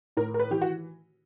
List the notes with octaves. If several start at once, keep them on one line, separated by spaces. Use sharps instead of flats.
A2 A#4
A#4
B4
E3 G4
F#4